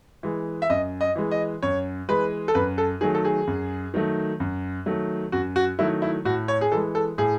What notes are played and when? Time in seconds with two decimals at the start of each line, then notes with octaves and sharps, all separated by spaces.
0.23 E3 G#3
0.62 E5
0.70 F#2 D#5
1.01 D#5
1.16 E3 G#3
1.31 D#5
1.63 F#2 C#5
2.09 E3 G#3 B4
2.48 A4
2.55 F#2 B4
2.78 A4
3.01 D#3 F#3 A3 G#4
3.15 A4
3.25 G#4
3.47 F#2
3.94 D#3 F#3 A3
4.40 F#2
4.86 D#3 F#3 A3
5.32 F#2 F#4
5.56 F#4
5.79 D#3 F#3 A3 E4
6.02 E4
6.25 A2 F#4
6.48 C#5
6.61 G#4
6.72 E3 A4
6.76 G#3
6.95 A4
7.18 A2 G#4